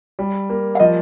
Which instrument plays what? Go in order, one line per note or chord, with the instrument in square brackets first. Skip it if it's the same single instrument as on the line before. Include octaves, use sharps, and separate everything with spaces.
[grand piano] G3
A#3
[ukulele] F5
[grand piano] F3 [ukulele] D#5